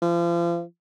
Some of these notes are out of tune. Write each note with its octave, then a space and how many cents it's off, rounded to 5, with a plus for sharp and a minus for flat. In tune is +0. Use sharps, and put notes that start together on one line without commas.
F3 -35